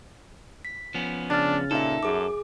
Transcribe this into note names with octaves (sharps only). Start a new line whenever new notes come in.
B6
F3 B3 C#4
C#3 D4 F6 A6
A#2 D#4 A4 E5
F#2 G#4 D6